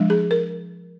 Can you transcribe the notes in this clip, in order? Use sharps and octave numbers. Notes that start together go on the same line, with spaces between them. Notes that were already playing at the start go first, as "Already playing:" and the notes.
Already playing: F3 G#3 D4
G#4
A#4